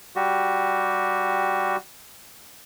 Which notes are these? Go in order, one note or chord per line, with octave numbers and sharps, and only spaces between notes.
G3 F#4 G4